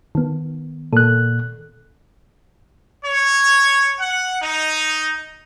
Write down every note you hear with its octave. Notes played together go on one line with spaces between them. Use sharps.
D#3 B3
A#2 A4 F#6
C#5
F#5
D#4